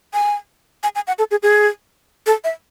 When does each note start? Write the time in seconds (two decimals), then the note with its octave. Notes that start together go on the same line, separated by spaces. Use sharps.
0.14 G#5
0.83 G#5
0.95 G#5
1.07 F#5
1.19 A4
1.31 G#4
1.43 G#4
2.26 A4
2.44 E5